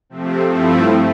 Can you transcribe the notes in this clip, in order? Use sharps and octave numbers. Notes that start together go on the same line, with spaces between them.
C3 F3 A3 C4
G2 F3 A3 C4 E4